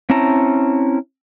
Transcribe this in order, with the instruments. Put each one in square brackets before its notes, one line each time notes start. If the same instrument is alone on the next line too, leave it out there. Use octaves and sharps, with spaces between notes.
[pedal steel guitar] C4 C#4 E4 A5 A#5